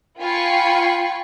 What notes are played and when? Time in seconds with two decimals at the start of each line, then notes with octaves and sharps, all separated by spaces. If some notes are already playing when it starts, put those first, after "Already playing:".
0.21 F4 G5 G#5 B5 C#6 C7